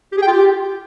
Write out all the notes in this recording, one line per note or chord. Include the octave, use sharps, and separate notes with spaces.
G4
G#4
G5
F4
G4